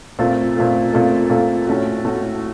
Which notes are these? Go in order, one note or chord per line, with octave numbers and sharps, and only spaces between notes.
A#2 A3 C4 F4 A4
A#2 A3 C4 F4 A4
A#2 A3 C4 F4 A4
A#2 A3 C4 F4 A4
A2 A3 C#4 F#4
A2 A3 C#4 F#4